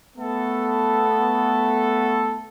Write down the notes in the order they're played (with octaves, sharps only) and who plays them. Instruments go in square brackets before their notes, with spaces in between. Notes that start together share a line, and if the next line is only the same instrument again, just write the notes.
[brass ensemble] A3 B3 A4